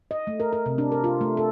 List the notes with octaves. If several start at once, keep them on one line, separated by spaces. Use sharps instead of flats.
D#5
A3
A#4
A#4
C3
D4
A#4
F4
A3
A4